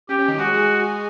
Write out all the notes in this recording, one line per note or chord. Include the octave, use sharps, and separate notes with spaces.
C#4 G4
C#4
D#3 D#4
G#3 F#4 G#4
G#3 G#4